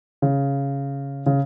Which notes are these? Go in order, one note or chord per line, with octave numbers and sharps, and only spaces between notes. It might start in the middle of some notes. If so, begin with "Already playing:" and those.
C#3
C#3